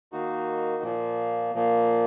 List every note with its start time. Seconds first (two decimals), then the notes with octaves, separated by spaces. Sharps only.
0.12 D#3 A#3 D#4 F#4
0.83 A#2 F3 A#3
1.55 A#2 F3 A#3